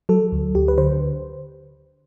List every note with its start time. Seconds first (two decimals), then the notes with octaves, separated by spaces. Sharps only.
0.09 F#3 A4
0.32 D2
0.55 D2 G4
0.68 B4
0.78 D3 C5